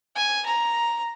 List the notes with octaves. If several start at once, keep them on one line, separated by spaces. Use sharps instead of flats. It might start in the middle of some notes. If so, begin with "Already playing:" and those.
G#5
A#5